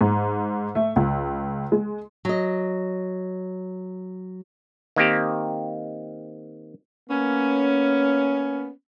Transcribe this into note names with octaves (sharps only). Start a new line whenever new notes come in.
G#2
A3
C#2
G#3
F#3 D#5
D#3 A#3 C4 G4
A#3 B3 C#4